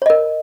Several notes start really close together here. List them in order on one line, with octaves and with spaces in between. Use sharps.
C#5 D#5 A#4